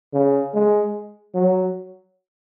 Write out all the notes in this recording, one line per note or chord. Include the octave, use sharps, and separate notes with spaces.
C#3
G#3
F#3